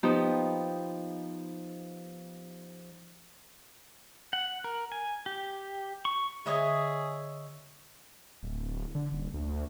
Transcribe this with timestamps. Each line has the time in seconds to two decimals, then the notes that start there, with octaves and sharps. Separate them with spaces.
0.03 F3 B3 D#4 G4
4.33 F#5
4.64 A#4
4.92 G#5
5.26 G4
6.05 C#6
6.46 D3 G#4 C#5 D#5 E5
8.43 D1
8.95 D3
9.12 D#1
9.34 D2